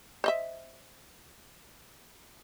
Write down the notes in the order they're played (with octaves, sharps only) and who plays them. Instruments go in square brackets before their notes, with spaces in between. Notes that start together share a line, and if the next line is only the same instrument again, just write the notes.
[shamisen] C5 D#5 E5